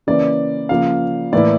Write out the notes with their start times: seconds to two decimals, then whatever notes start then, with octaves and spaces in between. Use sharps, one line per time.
0.07 C#3 E3 A#3 C#4 D5
0.69 C#3 F3 A#3 F5
1.32 A2 E3 A#3 E4 D5